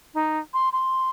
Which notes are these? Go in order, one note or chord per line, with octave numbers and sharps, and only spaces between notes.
D#4
C6
C6